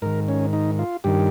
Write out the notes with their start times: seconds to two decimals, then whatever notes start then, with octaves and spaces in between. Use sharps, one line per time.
0.02 G#2 D#3 A#4
0.28 C#4
0.53 D#4
0.79 F4
1.04 G2 D#3 G4